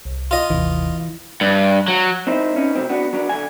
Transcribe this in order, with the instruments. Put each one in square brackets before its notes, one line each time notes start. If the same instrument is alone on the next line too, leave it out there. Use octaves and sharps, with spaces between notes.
[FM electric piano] C2
[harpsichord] F4 D#5
[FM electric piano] G#1 D#2 C3 [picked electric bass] E3
[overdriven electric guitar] G2
F#3
[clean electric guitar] C4 D#4 E4 C5
C#4 D#4 B4
C3 D#3 F#3 C4
B3 D4 F#4
F#3 B3 D4
D3 G#5